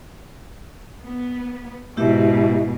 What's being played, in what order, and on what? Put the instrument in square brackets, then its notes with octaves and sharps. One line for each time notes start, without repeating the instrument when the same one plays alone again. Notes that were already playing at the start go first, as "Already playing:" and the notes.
[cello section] B3
[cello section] G#2 B2 [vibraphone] E4 G4 E5